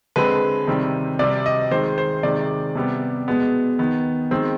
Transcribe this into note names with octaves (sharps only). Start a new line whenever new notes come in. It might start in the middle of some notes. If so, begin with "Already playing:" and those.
D3 G#3 C4 B4
C3 D#3 G3 C4
C3 G3 C4 D5
D#5
D#3 G#3 C4 C5
C5
C3 D#3 G#3 D5
C3 G3 B3
B2 G#3 B3
D#3 B3
D#3 G#3 C4